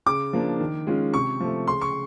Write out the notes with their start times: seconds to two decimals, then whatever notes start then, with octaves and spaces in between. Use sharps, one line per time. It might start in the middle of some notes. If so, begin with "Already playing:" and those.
0.06 C#3 D6
0.33 F3 A#3 D4
0.60 D#3
0.87 G#3 C#4 F4
1.14 C3 C#6
1.40 F3 A3
1.67 C#3 C6
1.81 C#6